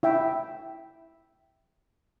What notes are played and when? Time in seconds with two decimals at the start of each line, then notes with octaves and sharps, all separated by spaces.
0.03 E4 E5 G5